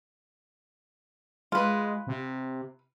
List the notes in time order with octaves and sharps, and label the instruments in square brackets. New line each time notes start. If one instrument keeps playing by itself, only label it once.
[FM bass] G#3 [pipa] F4 B4
[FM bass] C3